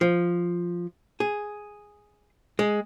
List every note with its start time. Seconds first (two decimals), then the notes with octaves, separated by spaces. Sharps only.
0.01 F3
1.20 G#4
2.59 G#3